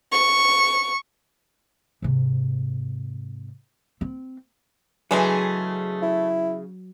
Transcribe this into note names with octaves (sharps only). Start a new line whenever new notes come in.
C#6
G#2 C3
C4
C#3 E3 F#3 G#3 A3 G#4
E4